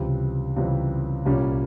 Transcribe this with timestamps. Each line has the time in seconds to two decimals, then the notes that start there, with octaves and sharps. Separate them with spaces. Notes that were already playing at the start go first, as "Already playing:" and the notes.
Already playing: C#2 C3 E3 G3
0.56 C#2 C3 E3 G3
1.25 C2 A#2 G3 C#4 G4